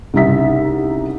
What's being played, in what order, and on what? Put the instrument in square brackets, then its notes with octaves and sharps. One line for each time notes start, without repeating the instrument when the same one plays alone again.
[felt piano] C2 C#3 G3 D#4 E5 B6